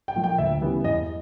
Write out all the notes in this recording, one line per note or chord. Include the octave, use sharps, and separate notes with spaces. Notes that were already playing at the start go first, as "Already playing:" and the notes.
G5
A#2 F3 A3
G5
D2 E5
C#3 E3 G3 B3
E2 D#5